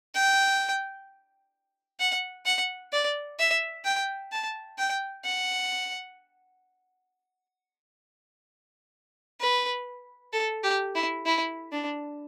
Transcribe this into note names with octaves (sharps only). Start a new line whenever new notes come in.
G5
F#5
F#5
D5
E5
G5
A5
G5
F#5
B4
A4
G4
E4
E4
D4